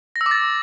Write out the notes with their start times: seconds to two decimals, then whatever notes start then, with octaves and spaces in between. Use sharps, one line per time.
0.16 A#6
0.21 E6
0.26 D6
0.31 A6